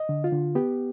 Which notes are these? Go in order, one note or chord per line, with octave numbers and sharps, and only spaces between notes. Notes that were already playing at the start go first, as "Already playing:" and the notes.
Already playing: D#5
D3
F4
D3
B3 G4